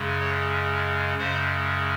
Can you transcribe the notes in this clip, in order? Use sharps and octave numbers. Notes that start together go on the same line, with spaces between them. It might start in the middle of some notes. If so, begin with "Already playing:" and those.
Already playing: F#2 C#3 G#3
C#5
F#2 C#3 G#3 C5